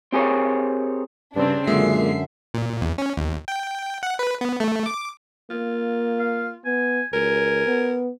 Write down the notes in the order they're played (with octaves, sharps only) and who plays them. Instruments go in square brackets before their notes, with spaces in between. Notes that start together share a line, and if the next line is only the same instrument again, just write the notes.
[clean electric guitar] C4 G4 G#4 A#4 C#5
[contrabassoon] G2 [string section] C#3 C4 D4
[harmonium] F#2 D3 E5 [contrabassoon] A#2 [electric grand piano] G#3 [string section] C7
[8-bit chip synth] A#2
E2
C#4
D#2
G5
F#5
B4
B3
A3
D6
[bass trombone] A#3 [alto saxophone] F4
[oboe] F5
[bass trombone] B3 [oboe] G#5
[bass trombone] C#2 [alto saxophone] A#4 [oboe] G#5
[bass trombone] B3